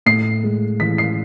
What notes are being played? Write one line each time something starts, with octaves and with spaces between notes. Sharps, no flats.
A2 C7
G#3
E3 B6
C7